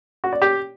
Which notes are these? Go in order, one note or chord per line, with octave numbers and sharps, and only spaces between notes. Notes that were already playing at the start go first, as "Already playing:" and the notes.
F#4
D5
G4